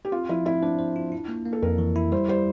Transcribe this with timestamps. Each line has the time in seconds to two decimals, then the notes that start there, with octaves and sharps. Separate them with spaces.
0.05 G4
0.12 C4 F4
0.29 F3 E4
0.46 C4 E4
0.62 D4 C5
0.79 C5
0.96 F4
1.12 E4
1.28 A#3
1.45 A#3
1.53 A4
1.62 F2 A#4
1.78 E3
1.96 E4
2.12 G3 C5
2.28 G3 C5